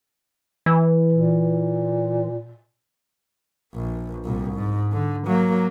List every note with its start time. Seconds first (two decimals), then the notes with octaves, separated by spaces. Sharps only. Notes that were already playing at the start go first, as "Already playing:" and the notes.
0.66 E3
1.12 A#2
3.74 A#1
4.25 C2 A#2
4.55 G#2
4.92 D3
5.27 F#3 A#3